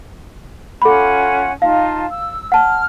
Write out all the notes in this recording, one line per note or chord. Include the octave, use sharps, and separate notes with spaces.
C#4 F4 A4 F#5 B5
D#4 F4 F5 A5
E6
F#5 A5 F6